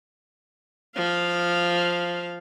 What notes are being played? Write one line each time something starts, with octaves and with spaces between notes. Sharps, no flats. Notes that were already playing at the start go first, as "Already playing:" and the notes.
F3 F5